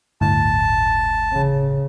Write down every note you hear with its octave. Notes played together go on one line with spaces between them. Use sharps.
G1 D2 A2 A5
C#3